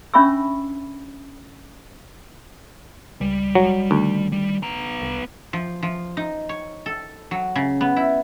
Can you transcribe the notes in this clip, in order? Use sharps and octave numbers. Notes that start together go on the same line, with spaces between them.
C#4 D4 E5 B5 C#6 E6
C#2 G3
F1 F#3
D2 D#3
G3
B3 A#5
C2
F3
F3
D#4
C#5
A4
F#3
C#3
B3
E4